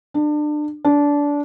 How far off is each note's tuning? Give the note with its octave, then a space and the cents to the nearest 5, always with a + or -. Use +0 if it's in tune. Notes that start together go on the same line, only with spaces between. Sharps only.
D4 +30
D4 -20